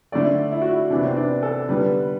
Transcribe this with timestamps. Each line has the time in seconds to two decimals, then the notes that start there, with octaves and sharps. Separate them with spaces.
0.12 D3 A3 D5
0.51 E4
0.62 F#4
0.71 E4
0.90 C3 E3 B3 D4
1.05 C4
1.17 D4
1.43 A4
1.69 D3 G3 B3 B4